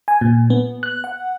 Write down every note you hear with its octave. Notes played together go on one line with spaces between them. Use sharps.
G#5
A#2
B3
F#6
F#5